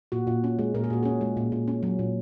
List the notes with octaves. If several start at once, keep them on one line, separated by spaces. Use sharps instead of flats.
A#2 F#4
A#2
C#4
G#3
A#2 A#4
G#4
A#2 F#4
C#4 G#4
G#3
A#2
A#2
C#4
F#3
A#2